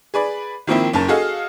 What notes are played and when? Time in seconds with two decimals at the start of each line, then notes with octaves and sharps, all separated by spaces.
0.14 G#4 B4 D5
0.67 D#3 F3 A#3 C4 E4
0.93 F#1 C#4 A#4 A5
1.08 F#4 G#4 A4 D#5 F5